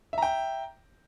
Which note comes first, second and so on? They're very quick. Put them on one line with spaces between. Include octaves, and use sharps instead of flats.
E5 A#5 G5